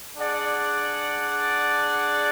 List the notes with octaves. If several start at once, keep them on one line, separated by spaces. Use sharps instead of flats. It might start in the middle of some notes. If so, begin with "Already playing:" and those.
D4 G#4 D5 F#5